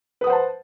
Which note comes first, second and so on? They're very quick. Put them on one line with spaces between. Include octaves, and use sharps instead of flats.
B4 D#6 F#5 C5 A5